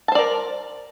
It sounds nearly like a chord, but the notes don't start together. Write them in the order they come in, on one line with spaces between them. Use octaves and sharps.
A5 C5 D5 A#4